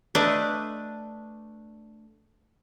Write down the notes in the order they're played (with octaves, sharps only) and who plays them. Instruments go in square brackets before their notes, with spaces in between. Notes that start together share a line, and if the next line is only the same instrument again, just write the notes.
[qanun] A3 D4 B4 D#5